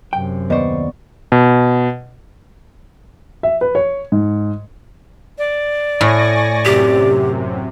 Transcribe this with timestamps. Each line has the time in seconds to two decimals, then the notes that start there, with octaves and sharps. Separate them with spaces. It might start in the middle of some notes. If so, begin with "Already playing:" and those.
0.13 F#2 C3 G5
0.50 D#2 B3 B4 C5 D5 D#5 C#6
1.32 B2
3.43 E5
3.61 B4
3.75 C#5
4.12 G#2
5.38 D5
6.01 A2 G#5 C#6 A#6
6.65 F#2 C3 G4